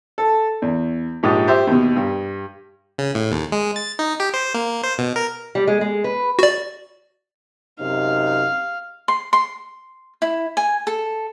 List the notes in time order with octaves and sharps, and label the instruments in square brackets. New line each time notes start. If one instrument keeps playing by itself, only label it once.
[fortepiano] A4
E2
A#1 G#2 G4 D#6
G4 C5 E5
D#2 B2
G2
[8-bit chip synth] C#3
A2
D#2
G#3
A6
D#4
G4
C5
A#3
C5
B2
A#4
[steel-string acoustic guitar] G3
G#3
G#3
B4
[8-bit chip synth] F#4 D5
[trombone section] F#2 C3 D#4 [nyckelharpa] F5
[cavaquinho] C6
C6
E4
G#5
A4